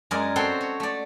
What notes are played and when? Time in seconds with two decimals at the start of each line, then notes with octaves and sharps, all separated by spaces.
0.11 F#2 G#3 G#4 A#4 D5 G#5
0.36 C4 F#4 A4 C5 C#5 G5
0.61 C#5
0.80 A3 D5